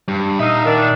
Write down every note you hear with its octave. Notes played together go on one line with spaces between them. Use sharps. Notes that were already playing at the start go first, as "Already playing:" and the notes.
G2
A#2 D#4 E5 F5 D#6 E6
D#3 D4